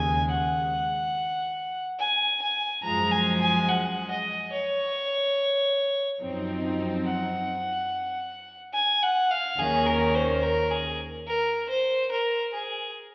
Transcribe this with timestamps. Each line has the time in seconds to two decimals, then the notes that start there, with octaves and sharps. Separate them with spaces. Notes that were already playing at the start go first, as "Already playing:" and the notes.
Already playing: D#2 C#3 G#3 G#5
0.31 F#5
1.99 G#5
2.42 G#5
2.84 F#2 F3 G#3 A#5
3.12 G#5
3.41 G#5
3.69 F#5
4.11 D#5
4.52 C#5
6.21 F#2 F3 C4 D#4
7.06 F#5
8.74 G#5
9.03 F#5
9.31 F5
9.59 D#2 D#3 A#3 C#4 G#4
9.86 A#4
10.15 C5
10.43 A#4
10.71 G#4
11.28 A#4
11.69 C5
12.11 A#4
12.54 G#4